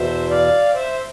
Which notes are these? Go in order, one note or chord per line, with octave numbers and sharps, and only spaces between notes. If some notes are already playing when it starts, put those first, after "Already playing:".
Already playing: E2 B2 C5 E5
D5 F5
C5 E5